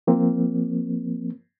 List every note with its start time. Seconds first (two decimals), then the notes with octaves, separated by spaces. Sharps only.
0.07 F3 A#3 C4